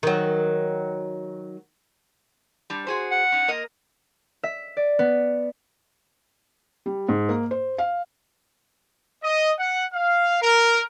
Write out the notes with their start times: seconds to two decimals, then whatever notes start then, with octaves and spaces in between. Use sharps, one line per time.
0.03 D#3 F#3
2.70 G3 D4
2.87 F#4 G#4 C5
3.11 F#5
3.32 C#4 D#4
3.48 A#3 A#4 D#5
4.43 E5
4.77 D5
4.99 B3
6.86 G3
7.09 G#2
7.29 A#3
7.51 C5
7.78 F5
9.23 D#5
9.59 F#5
9.94 F5
10.41 A#4